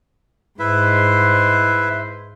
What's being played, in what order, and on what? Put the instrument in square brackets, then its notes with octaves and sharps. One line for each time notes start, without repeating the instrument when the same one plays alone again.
[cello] G#2 C5 [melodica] E4 B4 E5